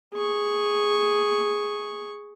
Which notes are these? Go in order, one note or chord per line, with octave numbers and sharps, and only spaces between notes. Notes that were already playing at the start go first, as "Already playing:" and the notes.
G#4 C#6